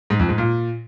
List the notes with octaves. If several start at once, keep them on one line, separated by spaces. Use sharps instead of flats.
G#2
F2
G#2
A#2